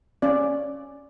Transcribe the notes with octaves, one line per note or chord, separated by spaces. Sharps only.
C#4 D5